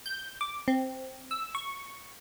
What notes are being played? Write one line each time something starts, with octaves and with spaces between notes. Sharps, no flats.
G6
D6
C4
E6
C#6